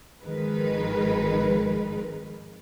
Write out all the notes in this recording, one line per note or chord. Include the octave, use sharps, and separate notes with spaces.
G#1 D#3 F3 G#3 A#4 B4